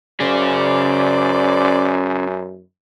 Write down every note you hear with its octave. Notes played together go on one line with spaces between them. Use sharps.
F#2 C#4 G#4 C5 D5